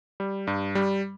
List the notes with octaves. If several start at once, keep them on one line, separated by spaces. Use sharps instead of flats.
G3
G2
G3